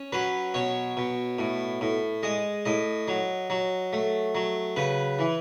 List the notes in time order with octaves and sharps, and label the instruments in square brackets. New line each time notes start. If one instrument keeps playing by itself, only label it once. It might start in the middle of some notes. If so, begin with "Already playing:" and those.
Already playing: [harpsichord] C#4
F#3 B4
B2 C#5
B2
A2
A2
G#3 D#5
A2 D#5
F#3
F#3
A3
F#3
C#3 B4
E3